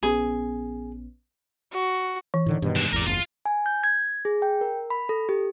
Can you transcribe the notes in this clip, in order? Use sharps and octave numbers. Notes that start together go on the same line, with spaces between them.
A#1 B3 C#4 G#4
F#4
E3
A2 D3 D#3
G2 B2 D#3
G#3 D4
G#1 E2 A#4 D5
F#1 E2 F4
G#5
G6
G#6
G#4
G5
A#4
B5
A4
G4